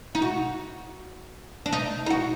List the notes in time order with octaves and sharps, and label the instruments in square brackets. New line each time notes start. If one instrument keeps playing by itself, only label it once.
[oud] D#4
F#4
D4
D#4
D#4
F#4